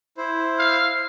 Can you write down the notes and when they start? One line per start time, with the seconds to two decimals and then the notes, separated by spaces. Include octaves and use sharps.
0.17 E4 C5
0.59 F5